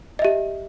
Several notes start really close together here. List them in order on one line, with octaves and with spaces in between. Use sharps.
D#5 E5 G4